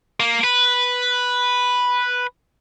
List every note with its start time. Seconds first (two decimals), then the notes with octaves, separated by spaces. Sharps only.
0.20 A#3
0.44 B4